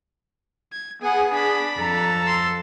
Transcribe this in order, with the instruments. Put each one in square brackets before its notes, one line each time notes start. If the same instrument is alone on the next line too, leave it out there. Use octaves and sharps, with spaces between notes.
[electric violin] G#6
[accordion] B3 G#4 [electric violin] F#5 G#5
[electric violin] D4 B5
[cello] F2 A4 [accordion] A#5
[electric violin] C6 E6